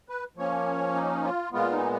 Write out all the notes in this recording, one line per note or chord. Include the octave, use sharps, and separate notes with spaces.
B4
F3 A#3 C#4 C#5
D#4
F4
A#2 G#3 B3 F4
D#4